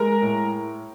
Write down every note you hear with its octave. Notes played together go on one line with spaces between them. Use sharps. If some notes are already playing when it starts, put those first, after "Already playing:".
Already playing: G#3 A#4 A#5
A2